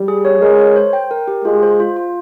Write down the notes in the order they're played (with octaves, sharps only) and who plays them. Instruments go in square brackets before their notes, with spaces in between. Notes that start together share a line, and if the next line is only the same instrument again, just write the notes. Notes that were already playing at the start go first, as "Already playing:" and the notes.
Already playing: [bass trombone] G3
[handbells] G#4
C#5
[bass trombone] G#3 [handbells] A#4
[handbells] C#5
C5
G5
A#4
G4
[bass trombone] G#3 [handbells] F4
[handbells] C5
F4
F4